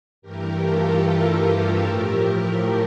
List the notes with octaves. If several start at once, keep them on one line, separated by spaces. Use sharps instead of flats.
G2 E3 A3 G4 A#4
F4 A4
G4 A#4
A2 F3 A3